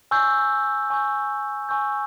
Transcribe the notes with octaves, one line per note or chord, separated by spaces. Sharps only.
G#5 C#6 E6 G6
G#5 C#6 E6 G6
G#5 C#6 E6 G6